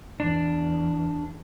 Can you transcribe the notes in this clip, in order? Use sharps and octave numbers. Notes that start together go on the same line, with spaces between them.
E2 D4